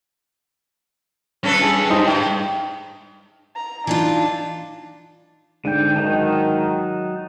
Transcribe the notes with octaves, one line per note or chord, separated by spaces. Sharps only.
G2 C#4 A4 B4
G#4
D#4 G4 C5
G#3 G5
A#5
E3 D4 D#4 F4
G#2 D3 D4 G5
D#3 F#3 D#4 A5